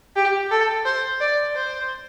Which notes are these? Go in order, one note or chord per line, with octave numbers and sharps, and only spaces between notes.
G4
A4
C5
D5
C5